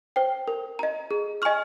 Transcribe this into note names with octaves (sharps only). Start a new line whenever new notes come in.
C5 G5
A#4
D#5 A#5
G#4
D#5 G#5 C#6 F6